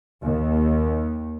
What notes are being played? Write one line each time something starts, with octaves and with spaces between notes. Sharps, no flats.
D#2